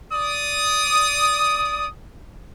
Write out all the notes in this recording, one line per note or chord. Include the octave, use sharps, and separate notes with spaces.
D5 D#6